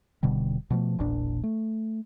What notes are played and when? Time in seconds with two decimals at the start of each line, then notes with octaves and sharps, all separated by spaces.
0.23 D#1 B2 D3 G3
0.70 B2 F3 A3
0.99 E1 A#1 A#2 D4
1.43 A3